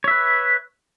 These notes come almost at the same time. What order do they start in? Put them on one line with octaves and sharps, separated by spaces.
C#5 E5 B4